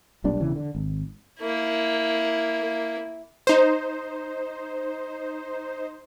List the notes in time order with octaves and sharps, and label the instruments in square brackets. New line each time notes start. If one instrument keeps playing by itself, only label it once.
[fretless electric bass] B1 A#2 G3 D4
E1 C#3 E3
D3
G#1
[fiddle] A#3 E4
[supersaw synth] D#4 C5